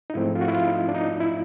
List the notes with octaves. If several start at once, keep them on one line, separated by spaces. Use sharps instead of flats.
D#4
G#2 F3 A3 C4 E4
F4
F#4
E4
F4
D#4
D4
D#4
E4